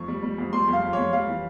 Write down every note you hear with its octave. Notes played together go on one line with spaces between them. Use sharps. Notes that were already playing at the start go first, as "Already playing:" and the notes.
Already playing: F2 C#6
G3
G3
F2
G3 C6
F2
F5
F2
F2 C#5
G3 F5
E3